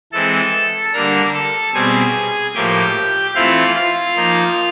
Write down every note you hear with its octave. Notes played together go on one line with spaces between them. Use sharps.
E3 G#3 C4 A4 A5
D3 G3 A#3 D4 A#4 A#5
A4 A5
B2 G3 C4 G#4 G#5
A2 F3 A#3 G4 G5
E3 A3 C4 E4 F4 F5
F4 F5
F3 A#3 D#4